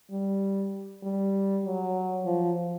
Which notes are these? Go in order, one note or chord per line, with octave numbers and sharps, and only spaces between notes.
G3
G3
F#3
F3